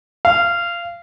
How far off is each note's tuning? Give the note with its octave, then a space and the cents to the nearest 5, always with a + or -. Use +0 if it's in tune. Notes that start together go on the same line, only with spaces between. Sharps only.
F5 -20